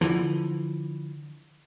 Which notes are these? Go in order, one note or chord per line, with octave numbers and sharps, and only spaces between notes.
D3 E3 F3